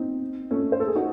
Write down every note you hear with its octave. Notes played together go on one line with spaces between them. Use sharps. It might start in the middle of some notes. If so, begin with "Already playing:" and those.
Already playing: C4 D#4
A3 C#4
C5
A4
G#4
D#4 F#4